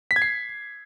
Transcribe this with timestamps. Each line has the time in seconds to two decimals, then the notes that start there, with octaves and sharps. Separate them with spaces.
0.11 B6
0.16 G#6
0.22 C7